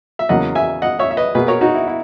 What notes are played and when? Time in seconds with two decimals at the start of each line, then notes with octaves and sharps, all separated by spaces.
0.19 E5
0.29 E2 C#3 F#3 A#3 D#5 F#5
0.55 E5 G#5
0.82 D#5 F#5
0.99 C#5 E5
1.11 E5
1.17 B4 D#5
1.35 B2 A#3 G#4 B4
1.48 A#4 C#5
1.61 D#4 F#4
1.74 E4
1.88 E4